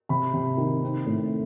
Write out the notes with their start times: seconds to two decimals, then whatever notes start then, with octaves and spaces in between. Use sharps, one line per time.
0.09 C3 B5
0.33 C3
0.57 D#3
0.82 C4
1.06 A2